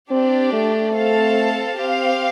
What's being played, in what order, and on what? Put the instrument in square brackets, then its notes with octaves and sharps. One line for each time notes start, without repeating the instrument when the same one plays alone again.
[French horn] C4 [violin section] D4 G4 D5
[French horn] A3
[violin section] C4 A4 F5 A5
C4 G4 F5